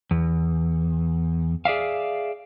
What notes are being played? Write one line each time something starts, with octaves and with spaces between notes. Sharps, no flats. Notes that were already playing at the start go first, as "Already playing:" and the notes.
E2
G#4 D5 E5 F5